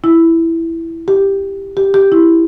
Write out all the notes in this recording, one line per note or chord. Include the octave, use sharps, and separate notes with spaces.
E4
G4
G4
G4
E4